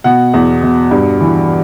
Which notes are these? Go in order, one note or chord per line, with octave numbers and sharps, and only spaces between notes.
B2 F#5
E2
B2
G2
E3